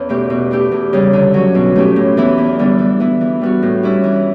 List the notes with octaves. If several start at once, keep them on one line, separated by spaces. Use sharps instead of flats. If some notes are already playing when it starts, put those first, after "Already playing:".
Already playing: E2 E3 B3 C#4
B2 A3 E4 G4
B2
A3 E4 G4
E2
C#3 G3
D3
F#3 C#4
B2
A3 C#4 G4
A2
E3 B3 E4
E2
D3 G3 B3 D4
E3
B3 E4
E3
G3 B3 F#4
A2
G3 C#4 E4
E3